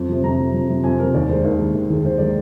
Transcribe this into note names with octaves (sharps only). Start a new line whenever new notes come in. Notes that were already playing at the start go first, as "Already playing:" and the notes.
Already playing: F2
C3 F3
F2 A#5
C3 F3
F2
C3 F3
F2 G#5
C3 F3 A#4
D#2 D5
D#3 G#3 C5
D#2 A#4
D#3 G#3
D#2
D#3 G#3
D#2 C5
D#3 G#3 D5